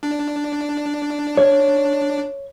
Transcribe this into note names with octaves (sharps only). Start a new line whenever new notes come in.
D4
C#5